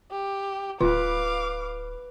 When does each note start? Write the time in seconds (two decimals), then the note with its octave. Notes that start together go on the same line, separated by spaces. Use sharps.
0.11 G4
0.81 D1 F4 B4 F5 D6